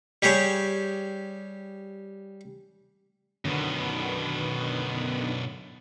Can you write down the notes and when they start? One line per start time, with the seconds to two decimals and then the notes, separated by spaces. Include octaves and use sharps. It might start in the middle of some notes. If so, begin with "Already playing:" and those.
0.22 G3 G4 G#4 C#5
3.45 F#2 B2 D3 D#3 B3